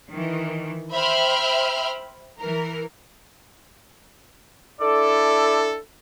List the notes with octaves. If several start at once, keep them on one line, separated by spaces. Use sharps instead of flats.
D#3 E3
C5 E5 G5 B5 F6
E3 A#4
D4 E4 A4 D5